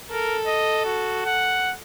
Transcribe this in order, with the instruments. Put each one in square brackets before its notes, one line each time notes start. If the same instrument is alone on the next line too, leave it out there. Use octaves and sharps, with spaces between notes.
[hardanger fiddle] A4 [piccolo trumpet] A#4
[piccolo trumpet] D#5
F#4
F#5